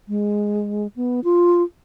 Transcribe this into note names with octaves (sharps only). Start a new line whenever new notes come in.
G#3
B3
F4